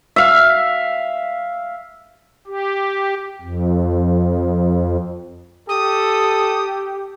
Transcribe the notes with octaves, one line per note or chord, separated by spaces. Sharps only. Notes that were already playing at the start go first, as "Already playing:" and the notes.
E5 F5
G4
F2
G4 A4 D#6